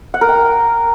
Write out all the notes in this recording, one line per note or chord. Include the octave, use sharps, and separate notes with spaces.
F#5
A#4
G5